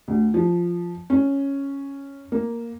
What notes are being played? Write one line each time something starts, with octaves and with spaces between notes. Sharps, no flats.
D2
F3
C#4
A#3